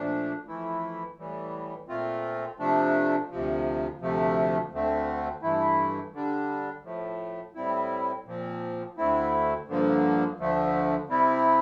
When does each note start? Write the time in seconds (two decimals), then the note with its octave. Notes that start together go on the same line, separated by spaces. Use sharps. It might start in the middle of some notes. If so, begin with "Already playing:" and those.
Already playing: A#2 F3 A3 D4
0.47 F2 E3 A3 E4
1.18 A2 E3 G3
1.88 A#2 A3 C4 F4
2.59 C3 F3 A3 D4
3.31 D2 C3 F3
4.01 D2 C3 F3 A3
4.72 D2 D3 A3 C4
5.42 G2 E3 A3 E4
6.13 D3 G3 D4
6.84 A2 F3 A3
7.54 A2 G3 C4 E4
8.26 A#2 F3 C4
8.97 D2 D3 A3 C4 E4
9.68 G2 D3 F3 A#3
10.38 D2 D3 F3 A3
11.09 C3 G3 C4 E4